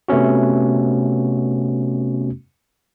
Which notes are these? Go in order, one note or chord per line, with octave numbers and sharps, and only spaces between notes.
C3 A3 B3 C#4 F#4